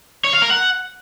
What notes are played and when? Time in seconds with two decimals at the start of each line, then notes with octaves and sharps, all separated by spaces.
0.24 C#5
0.33 F5
0.42 A#4
0.51 F#5